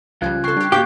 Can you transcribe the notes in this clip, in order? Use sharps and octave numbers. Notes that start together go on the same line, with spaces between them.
C#2 C#3 F3 G3 F4 F#6 G#6
C4 A4 C#6 F#6 C7
G3 D4 G4
G#2 A#3 F#4 G4 F5 G5 G6